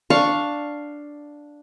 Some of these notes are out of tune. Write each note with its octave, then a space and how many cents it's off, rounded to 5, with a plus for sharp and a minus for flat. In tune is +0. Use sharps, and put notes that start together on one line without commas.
D4 +0 F5 +0 C#6 +0